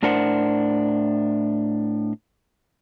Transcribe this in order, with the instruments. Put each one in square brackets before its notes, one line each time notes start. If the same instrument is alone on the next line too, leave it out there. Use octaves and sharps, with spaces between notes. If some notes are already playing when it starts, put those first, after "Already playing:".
[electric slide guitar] A2 D4 A#4 C5 F#5